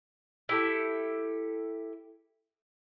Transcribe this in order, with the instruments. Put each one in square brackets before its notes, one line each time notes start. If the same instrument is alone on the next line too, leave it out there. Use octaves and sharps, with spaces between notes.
[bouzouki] E4 G4 A4